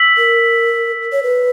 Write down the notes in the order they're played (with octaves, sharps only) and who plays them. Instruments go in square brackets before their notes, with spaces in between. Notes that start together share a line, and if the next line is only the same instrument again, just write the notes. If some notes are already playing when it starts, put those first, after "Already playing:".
Already playing: [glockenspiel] E6 B6 F#7
[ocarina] A#4
C#5
B4